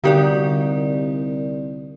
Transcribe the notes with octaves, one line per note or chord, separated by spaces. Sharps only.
C2 D3 D#4 F#4 G4 A#4 D5